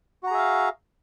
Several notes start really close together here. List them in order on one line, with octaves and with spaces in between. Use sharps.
F#4 A#5 G#4 E5 F5